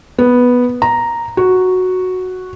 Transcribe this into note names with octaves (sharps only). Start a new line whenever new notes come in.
B3
A#5
F#4